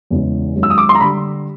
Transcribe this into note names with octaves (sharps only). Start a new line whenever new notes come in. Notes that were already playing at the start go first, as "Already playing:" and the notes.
E2 C#3 E3 G#3
F#2 D#3 G#3
E6
D#6
D6
C6
A#5
D3 G3 B5